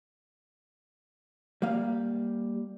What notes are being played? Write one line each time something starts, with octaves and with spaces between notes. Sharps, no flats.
G3 A#3 F5